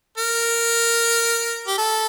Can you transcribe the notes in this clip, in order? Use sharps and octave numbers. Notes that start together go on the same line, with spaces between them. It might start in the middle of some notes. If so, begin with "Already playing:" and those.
A#4
G4
A4